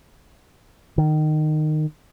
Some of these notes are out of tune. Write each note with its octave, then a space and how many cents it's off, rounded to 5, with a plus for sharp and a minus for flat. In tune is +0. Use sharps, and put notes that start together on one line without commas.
D#3 -20